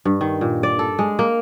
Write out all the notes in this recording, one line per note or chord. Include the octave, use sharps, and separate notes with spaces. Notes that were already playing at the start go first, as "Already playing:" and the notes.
G2
D#3
A#2
D5
A4
G#3
A#3